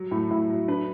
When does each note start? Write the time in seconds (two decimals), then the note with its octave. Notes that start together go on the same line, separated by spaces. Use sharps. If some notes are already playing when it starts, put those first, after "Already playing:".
Already playing: F#3
0.11 A2 E4
0.31 A2 E4
0.49 F#3
0.68 D4 B4